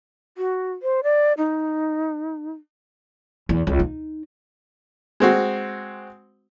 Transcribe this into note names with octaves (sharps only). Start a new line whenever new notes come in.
F#4
C5
D5
D#4
E2
C#2
D#4
G#3 C4 F#4